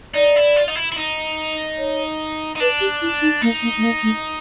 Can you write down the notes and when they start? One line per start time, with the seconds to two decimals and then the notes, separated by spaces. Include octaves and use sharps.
0.14 D#4 D5
0.36 E4
0.56 F4
0.68 D#4
0.75 E4
0.92 E4
0.96 D#4
1.78 C#5
2.56 D#4
2.60 D4 B4
2.81 G4
3.02 E4
3.22 D#4
3.42 A#3 D#4
3.62 A#3
3.77 A3
3.83 A#3
4.03 A3